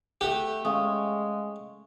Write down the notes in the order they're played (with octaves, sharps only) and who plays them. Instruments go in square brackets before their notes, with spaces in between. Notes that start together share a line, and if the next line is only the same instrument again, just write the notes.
[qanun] A3 E5 F#5 [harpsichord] G4
[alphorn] G#3 [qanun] C#4 [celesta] F5 D#6